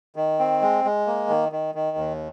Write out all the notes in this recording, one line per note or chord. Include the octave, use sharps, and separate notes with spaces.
D#3
C4
G#3
G#3
A#3
D#3
D#3
D#3
D#2